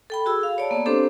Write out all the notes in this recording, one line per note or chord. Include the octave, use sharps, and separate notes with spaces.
A4 G5 B5
F#4 G#4 E6
F5
C#5 D5 A5
A#3 B3
C4 D4 G4 A4 C5